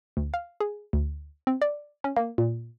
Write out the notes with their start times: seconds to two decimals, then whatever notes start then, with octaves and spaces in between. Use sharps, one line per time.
0.17 D2
0.34 F5
0.61 G#4
0.93 D2
1.47 C4
1.62 D5
2.04 C#4
2.17 A#3
2.38 A#2